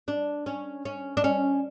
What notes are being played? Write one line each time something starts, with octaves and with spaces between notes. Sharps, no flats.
D4
C#4
C#4
D4
C#4